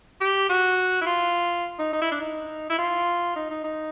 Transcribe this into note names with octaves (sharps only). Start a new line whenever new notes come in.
G4
F#4
E4
F4
D#4
D#4
E4
D4
D#4
E4
F4
D#4
D#4
D#4